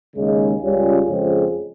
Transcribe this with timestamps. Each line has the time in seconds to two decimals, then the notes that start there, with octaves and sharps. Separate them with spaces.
0.15 D#2 C#3 G#3
0.61 C#2 C#3 G3 C#4 F4
1.08 F2 C#3 G#3 C4